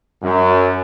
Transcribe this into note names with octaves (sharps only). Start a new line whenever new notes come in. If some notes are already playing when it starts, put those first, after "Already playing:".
F#2